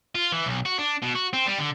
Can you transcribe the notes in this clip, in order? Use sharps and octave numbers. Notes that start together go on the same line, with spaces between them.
F4
E3
B1
F#4
D4
B2
F#4
C4
G3
D3